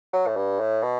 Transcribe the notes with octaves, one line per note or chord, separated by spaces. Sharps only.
F#3
A2
G2
A2
B2